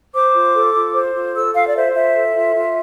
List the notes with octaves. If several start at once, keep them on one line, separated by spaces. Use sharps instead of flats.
C5 D6
F4
A4
F4
C5
F4
A4 E6
F4 F5
D5
C5 E5
F4 E5
A4
F4
F4